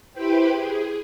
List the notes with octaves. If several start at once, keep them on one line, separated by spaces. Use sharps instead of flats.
E4 G4 B4 C5 G5 B5
G#4